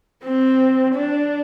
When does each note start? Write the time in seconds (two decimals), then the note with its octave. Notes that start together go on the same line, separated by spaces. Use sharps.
0.24 C4
0.95 D4